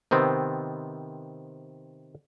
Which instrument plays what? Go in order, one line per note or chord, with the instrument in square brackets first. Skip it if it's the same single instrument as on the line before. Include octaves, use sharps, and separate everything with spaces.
[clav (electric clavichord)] C3 D#3 B3 C4